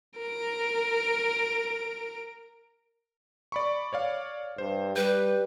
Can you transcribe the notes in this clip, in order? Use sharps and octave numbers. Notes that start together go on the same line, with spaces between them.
A#4 D7
D5 B5 C#6
C#5 D5 F5
G2 C5
G3 B4 G6